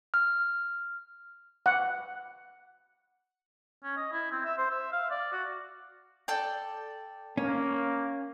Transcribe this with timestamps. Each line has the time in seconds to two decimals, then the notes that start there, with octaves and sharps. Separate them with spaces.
0.14 F6
1.66 F#5
3.84 C#4
3.97 D#5
4.12 E4
4.32 C4
4.45 E5
4.58 C5
4.70 E5
4.92 F5
5.10 D5
5.32 F#4
6.28 A4 D5 G5
7.37 A#3 C#4